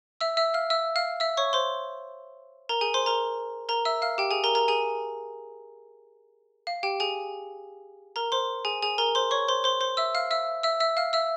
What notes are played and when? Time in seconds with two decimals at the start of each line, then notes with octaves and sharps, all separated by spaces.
0.21 E5 E6
0.37 E5 E6
0.54 F5 F6
0.70 E5 E6
0.96 F5 F6
1.20 E5 E6
1.37 C#5 C#6
1.53 C5 C6
2.69 A#4 A#5
2.81 G#4 G#5
2.94 C5 C6
3.06 A#4 A#5
3.69 A#4 A#5
3.85 E5 E6
4.02 F5 F6
4.18 G4 G5
4.31 G#4 G#5
4.44 A#4 A#5
4.55 A#4 A#5
4.68 G#4 G#5
6.67 F5
6.83 G4 G5
7.00 G#4 G#5
8.16 A#4 A#5
8.32 C5 C6
8.65 G#4 G#5
8.82 G#4 G#5
8.98 A#4 A#5
9.15 C5 C6
9.31 C#5 C#6
9.48 C5 C6
9.64 C5 C6
9.81 C5 C6
9.97 E5 E6
10.15 F5 F6
10.31 E5 E6
10.63 E5 E6
10.80 E5 E6
10.97 F5 F6
11.13 E5 E6